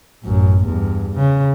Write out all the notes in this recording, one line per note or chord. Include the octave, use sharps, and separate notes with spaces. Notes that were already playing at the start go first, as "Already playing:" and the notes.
A1 F#2
E2 G2
C#3